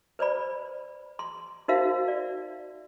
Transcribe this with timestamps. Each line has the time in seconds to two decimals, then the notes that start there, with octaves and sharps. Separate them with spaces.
0.19 B4 C5 D5 B5
1.19 C6
1.68 D#4 F#4 A#4 C5 E5 F5
2.08 D5